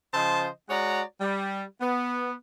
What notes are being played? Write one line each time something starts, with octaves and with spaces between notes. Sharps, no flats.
C#3 F3 C5 D#5 A5 C6
G#3 F#4 C#5 D5 F#5 A#5
G3
B3